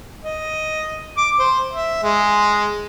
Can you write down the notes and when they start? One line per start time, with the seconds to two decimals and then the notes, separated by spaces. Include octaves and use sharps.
0.25 D#5
1.17 D6
1.39 C5
1.73 E5
2.03 G#3